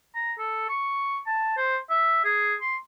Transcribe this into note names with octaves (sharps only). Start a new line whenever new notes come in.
A#5
A4
C#6
A5
C5
E5
G#4
C6